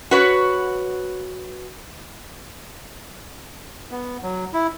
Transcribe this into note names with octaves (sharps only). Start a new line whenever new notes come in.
F#4 B4 C#5
B3
F#3
E4